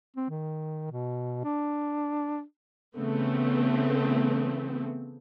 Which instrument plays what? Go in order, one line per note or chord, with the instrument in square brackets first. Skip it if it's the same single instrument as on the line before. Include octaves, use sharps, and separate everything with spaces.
[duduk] C4
D#3
B2
D4
[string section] C#3 E3 A3 B3 C4